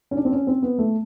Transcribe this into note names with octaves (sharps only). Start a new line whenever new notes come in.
C#4
D4
C4
C#4
C4
B3
A3